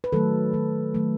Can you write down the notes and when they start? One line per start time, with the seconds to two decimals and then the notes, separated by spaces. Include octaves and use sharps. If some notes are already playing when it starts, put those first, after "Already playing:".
0.04 B4
0.12 D#3 F#3 A3 A4
0.53 D#3 F#3 A3
0.95 D#3 F#3 A3